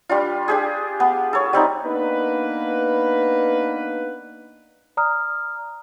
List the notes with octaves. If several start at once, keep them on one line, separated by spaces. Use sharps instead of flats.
G3 D4 F4
D4 G4 G#4
B3
A4 C#5
G3 C4 D#4
A#3 B3 D4 D#4 B4
D5 A#5 D#6 F6